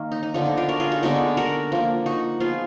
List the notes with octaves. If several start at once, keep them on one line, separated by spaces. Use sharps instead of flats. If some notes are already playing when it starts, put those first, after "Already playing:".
Already playing: D#3 A#3
D#4
D#4
D3 F3 B3 D#4
D#4
D4 F4
F#4 A#4
F4 G#4
D#4 F#4
D3 G#3 B3 D#4 F#4
F#4 A#4
F3 A#3
D#4 F#4
F3 B3 F4 G#4